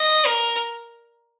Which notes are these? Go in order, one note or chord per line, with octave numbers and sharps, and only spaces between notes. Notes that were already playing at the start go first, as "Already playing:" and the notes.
Already playing: D#5
A#4